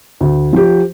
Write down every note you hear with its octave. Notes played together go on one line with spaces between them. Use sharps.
D2
F3 G4